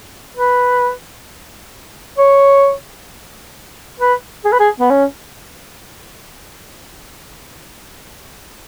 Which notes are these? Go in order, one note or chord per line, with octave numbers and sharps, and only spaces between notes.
B4
C#5
B4
G#4
B4
G#4
B3
C#4